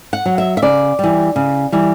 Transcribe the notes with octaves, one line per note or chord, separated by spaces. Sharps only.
F#5
F#3
E5
E5
C#3 D5
E3 G3
C#3
E3 G3